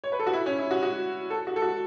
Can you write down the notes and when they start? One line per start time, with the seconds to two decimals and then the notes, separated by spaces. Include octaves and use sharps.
0.04 C#5
0.12 B4
0.19 A4
0.26 F#4
0.33 E4
0.46 C#4
0.58 E4
0.71 F#4
0.83 F#4
1.30 A4
1.47 F#4
1.56 A4
1.62 F#4